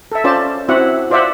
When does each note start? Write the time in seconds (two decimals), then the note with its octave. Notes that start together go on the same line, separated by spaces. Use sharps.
0.12 A4 E5
0.24 C#4 F4 C5 D5 A5
0.69 C4 E4 F#4 E5 F#5
1.10 F4 C5 D5 E5 F#5